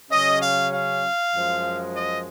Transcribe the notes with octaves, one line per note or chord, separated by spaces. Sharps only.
C#3 F#3 C#4 D#5
F5
F5
F#2 F3 G#3
D#5